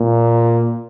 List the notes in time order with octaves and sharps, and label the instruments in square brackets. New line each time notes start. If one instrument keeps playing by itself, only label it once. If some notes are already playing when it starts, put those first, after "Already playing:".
Already playing: [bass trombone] A#2